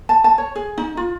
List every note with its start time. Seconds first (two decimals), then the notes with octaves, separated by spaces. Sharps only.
0.09 A5
0.24 A5
0.38 C#5
0.55 G#4
0.78 D#4
0.97 F4